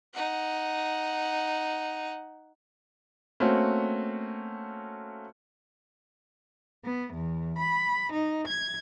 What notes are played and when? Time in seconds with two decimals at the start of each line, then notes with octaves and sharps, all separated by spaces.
0.15 D#4 F#5
3.40 A3 A#3 C4 C#4 F#4
6.84 B3
7.13 E2
7.57 B5
8.12 D#4
8.46 G#6